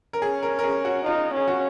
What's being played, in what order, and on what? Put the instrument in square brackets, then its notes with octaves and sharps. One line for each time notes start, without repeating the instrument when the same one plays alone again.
[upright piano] A#4
[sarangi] C#4 [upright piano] G#4
[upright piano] A#4
A#4
G#4
F#4
[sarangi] D#4 [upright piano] F4
[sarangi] C#4 [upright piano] G#4
[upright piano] F#4